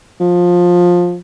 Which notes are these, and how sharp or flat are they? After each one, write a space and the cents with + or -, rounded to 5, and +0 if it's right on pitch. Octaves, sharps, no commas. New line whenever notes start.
F3 +15